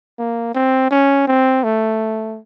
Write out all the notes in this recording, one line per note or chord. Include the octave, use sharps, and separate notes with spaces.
A#3
C4
C#4
C4
A3